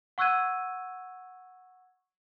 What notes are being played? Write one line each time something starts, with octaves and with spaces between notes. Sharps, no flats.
F#5 C#6 E6 F#6 G#6 D#7